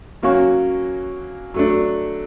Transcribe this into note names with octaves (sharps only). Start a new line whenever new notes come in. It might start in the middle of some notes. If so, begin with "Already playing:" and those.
F#3 A#3 C#4 F#4
F#3 A3 D4